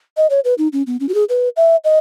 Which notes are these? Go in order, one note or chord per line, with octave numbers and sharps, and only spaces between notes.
D#5
C#5
B4
D#4
C#4
B3
C#4
F#4
G#4
B4
E5
D#5